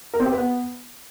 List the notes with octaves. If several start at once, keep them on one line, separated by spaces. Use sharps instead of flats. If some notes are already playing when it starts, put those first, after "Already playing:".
A#4
C4
G4
B4
B3